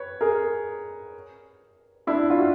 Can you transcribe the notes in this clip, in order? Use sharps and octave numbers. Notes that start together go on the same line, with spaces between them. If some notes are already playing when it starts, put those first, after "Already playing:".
Already playing: B4 C#5
G#4 A#4
D4 E4
F4
E4 F#4